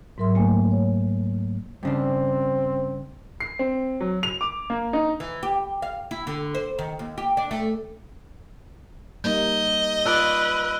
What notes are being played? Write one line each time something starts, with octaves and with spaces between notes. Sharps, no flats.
G#2 F#3 A#4 E5 C6
A3 A#3 G5 G#5
C#5
G2 C#3 C4 D4
C7
C4
F#3
F7
D6
A#3
D#4
E3
G4
F5
E4
D3
C5
D#3
D#2
G4
D4
A3
G3 A#3 D#4 D#5 G6
F4 B4 D5 E6 F#6 D7